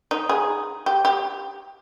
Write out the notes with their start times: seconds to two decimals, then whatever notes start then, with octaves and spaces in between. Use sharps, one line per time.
0.11 D#4
0.29 G#4
0.86 G4
1.05 G4